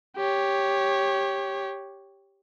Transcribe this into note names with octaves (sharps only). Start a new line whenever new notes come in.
G4 C#5